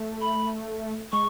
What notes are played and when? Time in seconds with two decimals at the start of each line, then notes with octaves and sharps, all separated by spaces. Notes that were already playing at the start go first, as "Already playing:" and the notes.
Already playing: A3
0.21 B5
1.12 G#3 C#6